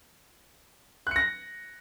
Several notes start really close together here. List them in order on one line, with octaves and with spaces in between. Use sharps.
F#6 C#7 A#6